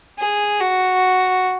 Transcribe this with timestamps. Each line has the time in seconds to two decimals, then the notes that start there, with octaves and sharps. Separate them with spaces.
0.19 G#4
0.60 F#4